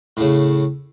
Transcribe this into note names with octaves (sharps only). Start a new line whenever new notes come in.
A2 C#3